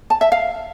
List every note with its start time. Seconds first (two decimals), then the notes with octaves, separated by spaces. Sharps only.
0.10 A5
0.21 E5
0.32 F5